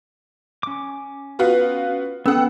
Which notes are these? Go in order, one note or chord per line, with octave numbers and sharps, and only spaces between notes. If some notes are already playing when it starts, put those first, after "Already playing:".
C#4 D6
B3 F4 F#4
B3 C#4 A4 F#5 G5 E6